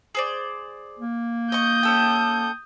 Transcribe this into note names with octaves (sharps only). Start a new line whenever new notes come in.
G#4 C5 D5
A#3
D#5 C#6 D#6 G6
C#4 A4 G5